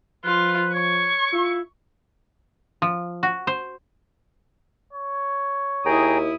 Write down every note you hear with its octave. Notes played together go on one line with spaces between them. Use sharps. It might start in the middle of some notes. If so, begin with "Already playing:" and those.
F3 F4 B4
C#5 C#6
E4 F4
F3
F#4
C5
C#5
D#2 E4 G#4 G5 A#5 D#6